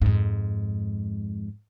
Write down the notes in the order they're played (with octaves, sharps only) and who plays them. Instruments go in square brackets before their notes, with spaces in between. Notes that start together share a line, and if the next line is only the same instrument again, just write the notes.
[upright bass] F2 G#2